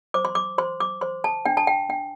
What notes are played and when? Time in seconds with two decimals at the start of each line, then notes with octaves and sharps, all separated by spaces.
0.14 C5 D6
0.25 C6
0.35 D6
0.58 C5 C6
0.80 D6
1.01 C5 C6
1.24 A5
1.45 D4 G5
1.57 A5
1.67 G5
1.89 D4 G5